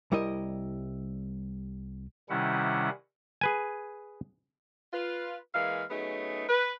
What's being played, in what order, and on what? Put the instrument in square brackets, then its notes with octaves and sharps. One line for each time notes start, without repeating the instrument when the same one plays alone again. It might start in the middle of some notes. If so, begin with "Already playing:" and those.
[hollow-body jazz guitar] C2 G3 E4 A#4 D#5
[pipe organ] C3 D#3 G3 C#4 E4 F#5
[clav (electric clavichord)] G#4 B4 G#5
[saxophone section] F4 B4
E3 G#3 A#3 F5
F#3 A3 B3 C#4 D#4 G#4
B4